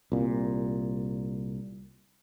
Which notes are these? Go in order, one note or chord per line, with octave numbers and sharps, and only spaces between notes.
C2 A#2